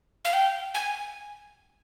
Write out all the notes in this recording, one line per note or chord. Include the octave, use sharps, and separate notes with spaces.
F5
G5
G#5